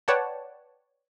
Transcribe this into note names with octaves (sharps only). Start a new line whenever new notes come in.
B4 C#5 D5 F#5 G5 A5